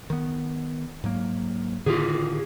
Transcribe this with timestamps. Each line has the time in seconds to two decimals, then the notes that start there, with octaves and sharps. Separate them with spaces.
0.10 D#3 B3
1.04 G#2 F#3 A#3
1.86 A2 D3 D#3 F4 G4 G#4